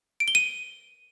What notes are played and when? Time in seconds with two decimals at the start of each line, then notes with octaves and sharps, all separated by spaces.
0.20 D7
0.28 G7
0.35 D#7